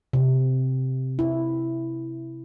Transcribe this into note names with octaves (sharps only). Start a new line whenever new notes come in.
C3
E4